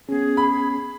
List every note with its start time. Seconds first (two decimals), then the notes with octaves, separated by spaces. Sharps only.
0.09 B3 C#4 G#4
0.37 B5